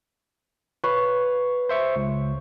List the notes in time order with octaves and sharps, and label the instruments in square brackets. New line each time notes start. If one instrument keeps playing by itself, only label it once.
[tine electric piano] B4 [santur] C#5 F5
[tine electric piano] C5 E5 C#6
C#2